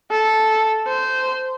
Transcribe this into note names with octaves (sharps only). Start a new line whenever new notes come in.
A4
C5